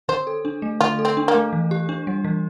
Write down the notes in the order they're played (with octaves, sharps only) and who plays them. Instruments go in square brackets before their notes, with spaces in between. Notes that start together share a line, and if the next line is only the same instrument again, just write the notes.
[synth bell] D3 [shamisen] C5
[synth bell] A4
D4
A3
[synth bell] D3 [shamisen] F4
[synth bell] A4
[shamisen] C4
[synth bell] D4
[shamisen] A#3
[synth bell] A3
E3
G4
D4
G3
E3